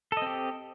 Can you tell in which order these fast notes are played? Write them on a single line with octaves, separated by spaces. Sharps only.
A4 D#5 C4 G4